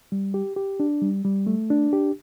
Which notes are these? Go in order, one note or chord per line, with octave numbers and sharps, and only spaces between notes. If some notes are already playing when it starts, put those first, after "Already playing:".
G3
G4
G4
D4
G3
G3
A3
D4
G4